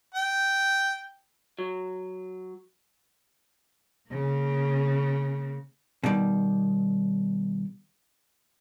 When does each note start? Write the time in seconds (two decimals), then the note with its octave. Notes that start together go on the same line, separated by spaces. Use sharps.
0.14 G5
1.59 F#3
4.10 C#3 A#3
6.03 B2 D#3 G3